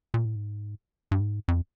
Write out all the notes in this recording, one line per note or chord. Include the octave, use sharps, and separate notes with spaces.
A#2
A2
G#2
G2
G#2
F2